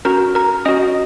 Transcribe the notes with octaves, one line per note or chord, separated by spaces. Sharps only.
C#4 F#4 A#4 A#5
A#4 A#5
C#4 F#4 D#5 D#6